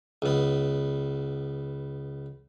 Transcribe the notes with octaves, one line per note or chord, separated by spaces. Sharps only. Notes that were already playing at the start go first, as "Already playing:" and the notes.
C#2 B3